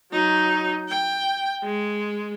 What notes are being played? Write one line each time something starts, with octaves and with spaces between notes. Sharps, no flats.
F#3 D#4
G5
G#3